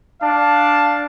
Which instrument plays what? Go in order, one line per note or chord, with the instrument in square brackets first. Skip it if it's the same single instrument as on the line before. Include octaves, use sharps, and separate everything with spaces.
[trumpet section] D4 F5 A5